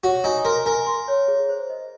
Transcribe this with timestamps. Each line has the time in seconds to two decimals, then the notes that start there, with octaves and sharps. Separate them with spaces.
0.04 F#4 C#5
0.24 D#4 G#5
0.45 A#4 C6
0.66 A#4 G#5
0.87 C6
1.08 C#5
1.28 G#4
1.49 C5
1.70 D#5